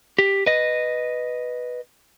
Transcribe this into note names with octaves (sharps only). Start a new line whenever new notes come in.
G4
B4 D#5